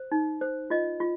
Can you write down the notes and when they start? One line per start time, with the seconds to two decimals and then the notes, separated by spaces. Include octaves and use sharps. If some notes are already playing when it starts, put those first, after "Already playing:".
Already playing: C5
0.12 D#4
0.41 C5
0.70 F4 D#5
1.00 F4